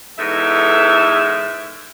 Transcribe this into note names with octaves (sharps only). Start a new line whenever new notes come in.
E2 G#2 A4 E5